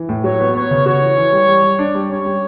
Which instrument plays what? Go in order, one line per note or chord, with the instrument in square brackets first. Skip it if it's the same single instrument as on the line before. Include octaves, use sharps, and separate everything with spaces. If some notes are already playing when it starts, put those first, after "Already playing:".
Already playing: [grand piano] E3
A2
[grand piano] F#3 [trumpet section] C#5
[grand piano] B3
[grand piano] B3 [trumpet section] C#5
[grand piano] C#3
[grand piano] F#4 [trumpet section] C#5
[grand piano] E3
E3
G3
G3
G3
D4
G3
[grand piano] C#4 [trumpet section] C#5
[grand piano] G3